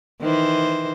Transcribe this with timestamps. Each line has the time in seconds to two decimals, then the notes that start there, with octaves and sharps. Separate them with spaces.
0.21 D#3 E3 C5